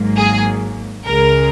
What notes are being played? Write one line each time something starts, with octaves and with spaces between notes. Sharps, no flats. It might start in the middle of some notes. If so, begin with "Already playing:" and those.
Already playing: G#1 G#2 F#3 A#3
G#4
C#2 C#3 G#3 A#4